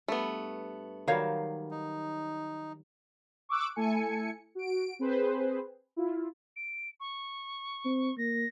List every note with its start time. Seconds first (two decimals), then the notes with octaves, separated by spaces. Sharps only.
0.08 G2 A3 B3
1.07 D#3 F#3 G3 C5 C#5 F5
1.71 D#4
3.49 C#6 D6 E6 F#6 D7
3.76 A3 E4 A4 G#5 C#7
4.55 F#4 D7
4.99 C4 G#4 B4 C5
5.96 E4 F4
6.56 D7
7.00 C#6
7.85 C4
8.18 A#3 A#6